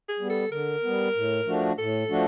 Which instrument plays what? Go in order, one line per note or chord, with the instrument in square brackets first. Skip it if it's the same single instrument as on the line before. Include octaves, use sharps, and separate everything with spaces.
[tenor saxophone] G#4
[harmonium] G3 B3
[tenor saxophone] A4
[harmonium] D3 [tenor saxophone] A#4
[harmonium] G3 B3
A2
F3 A3 D4 F#4
[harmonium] A2 [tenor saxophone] A4
[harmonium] F3 A3 D4 F#4